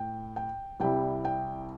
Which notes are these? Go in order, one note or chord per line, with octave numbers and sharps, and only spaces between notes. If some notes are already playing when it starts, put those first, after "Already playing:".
Already playing: A2 G5
G5
C2 C3 G3 E4 G5
G5